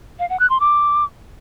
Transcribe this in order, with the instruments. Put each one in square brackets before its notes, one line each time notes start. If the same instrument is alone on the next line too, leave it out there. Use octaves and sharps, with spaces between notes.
[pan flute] F5
F#5
F#6
C6
D6